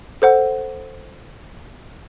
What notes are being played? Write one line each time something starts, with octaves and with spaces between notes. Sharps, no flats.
A4 C5 F#5